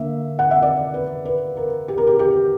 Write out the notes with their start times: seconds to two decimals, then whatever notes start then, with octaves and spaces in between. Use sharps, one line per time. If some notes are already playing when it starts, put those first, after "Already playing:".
Already playing: D3 A#3 E5
0.39 F#5
0.51 E5
0.62 D5
0.94 B4
1.25 B4
1.57 A#4
1.88 G4
1.98 A#4
2.07 G4
2.19 G4